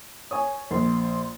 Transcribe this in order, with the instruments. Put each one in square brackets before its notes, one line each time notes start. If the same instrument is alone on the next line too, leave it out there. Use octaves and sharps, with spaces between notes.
[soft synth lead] C#5 [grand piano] G#5 C#6 D#6
[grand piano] A#1 [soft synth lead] C6